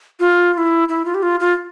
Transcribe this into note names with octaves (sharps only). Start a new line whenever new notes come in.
F4
F4
E4
E4
F4
G4
F4
F4